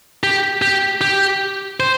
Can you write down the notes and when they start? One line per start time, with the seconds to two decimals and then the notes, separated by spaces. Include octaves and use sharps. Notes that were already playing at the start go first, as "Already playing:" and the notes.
0.23 G4
0.62 G4
1.01 G4
1.80 C5